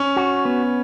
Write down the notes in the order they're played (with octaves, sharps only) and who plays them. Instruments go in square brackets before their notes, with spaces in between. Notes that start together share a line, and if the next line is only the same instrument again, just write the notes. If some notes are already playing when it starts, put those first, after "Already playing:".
Already playing: [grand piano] C#4
[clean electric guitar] F#4
B3